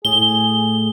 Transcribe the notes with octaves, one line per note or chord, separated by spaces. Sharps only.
A2 G#4 G7